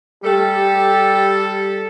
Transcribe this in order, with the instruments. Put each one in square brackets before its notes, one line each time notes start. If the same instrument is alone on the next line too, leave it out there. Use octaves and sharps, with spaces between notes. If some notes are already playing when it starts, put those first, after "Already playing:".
[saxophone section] G3 A4 [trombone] G4